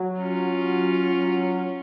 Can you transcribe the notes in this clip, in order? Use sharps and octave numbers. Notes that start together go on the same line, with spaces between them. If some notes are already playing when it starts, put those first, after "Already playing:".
Already playing: F#3
C#4 F4
F#3